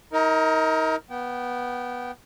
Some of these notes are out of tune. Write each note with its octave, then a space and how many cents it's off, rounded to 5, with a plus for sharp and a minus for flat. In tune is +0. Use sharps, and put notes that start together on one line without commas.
D#4 +35 A#4 +0
B3 -10 G5 -25